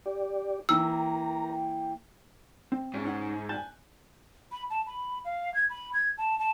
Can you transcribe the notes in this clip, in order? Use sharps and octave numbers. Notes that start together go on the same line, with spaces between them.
G4 D5
E3 A#3 A#4 G5 A#5 E6
C4
G#2 C#4
D#4 F#5
G#5 A5 F#6 G6
B5
A5
B5
F5
G#6
B5
G#6
A5
A5